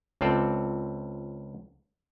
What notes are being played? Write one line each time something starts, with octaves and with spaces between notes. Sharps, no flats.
C#2 C4 F4 A4 D5